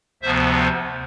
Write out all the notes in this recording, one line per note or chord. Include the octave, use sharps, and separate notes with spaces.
D2 C3 F3 B3 C5 E5